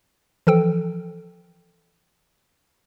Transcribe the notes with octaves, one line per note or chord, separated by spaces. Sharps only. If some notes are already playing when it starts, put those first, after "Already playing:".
E3 F3 A4 G5